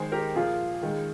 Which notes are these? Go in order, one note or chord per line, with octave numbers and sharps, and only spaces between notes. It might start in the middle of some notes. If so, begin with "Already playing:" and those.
Already playing: D#3 G#3 G#4 C5
G4 A#4
A#2 F3 A#3 F4 G#4
D#3 G#3